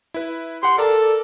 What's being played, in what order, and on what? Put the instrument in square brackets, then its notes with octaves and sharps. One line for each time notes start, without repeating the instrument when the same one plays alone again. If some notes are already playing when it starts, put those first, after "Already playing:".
[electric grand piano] E4 B4
[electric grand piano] G4 F#5 [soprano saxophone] C6
[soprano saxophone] A4 [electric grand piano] A#4 D5 A#5